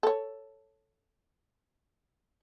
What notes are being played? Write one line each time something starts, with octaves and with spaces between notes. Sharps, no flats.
A4 C#5